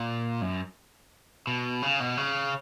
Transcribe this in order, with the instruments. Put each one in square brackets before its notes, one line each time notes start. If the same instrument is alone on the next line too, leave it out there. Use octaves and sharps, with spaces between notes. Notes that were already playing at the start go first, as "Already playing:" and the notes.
Already playing: [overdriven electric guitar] A#2
F#2
B2
C#3
B2
C#3